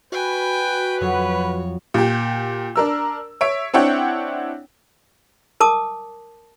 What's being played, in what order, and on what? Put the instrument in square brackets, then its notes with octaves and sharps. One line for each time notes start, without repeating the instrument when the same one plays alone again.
[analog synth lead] F#4 [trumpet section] B4 [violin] G5 G#5
[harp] F2 F#3 [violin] C#5
[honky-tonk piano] A#2 G4
D4 A#4 E6
C#5 E5 D7
C4 D4 E4 C#5 F#5 G5
[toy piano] A#4 A5 D6 D#6